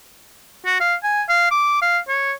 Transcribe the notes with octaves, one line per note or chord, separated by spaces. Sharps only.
F#4
F5
G#5
F5
D6
F5
C#5